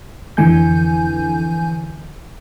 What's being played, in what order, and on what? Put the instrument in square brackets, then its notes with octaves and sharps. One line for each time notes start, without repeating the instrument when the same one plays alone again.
[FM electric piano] F2 D3 E3 G#5 G6